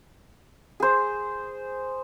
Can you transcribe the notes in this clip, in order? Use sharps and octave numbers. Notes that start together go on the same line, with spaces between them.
G#4 C5